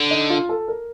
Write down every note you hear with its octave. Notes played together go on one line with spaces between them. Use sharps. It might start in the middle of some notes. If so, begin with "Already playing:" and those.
Already playing: D3
D#4
F4
A4
A#4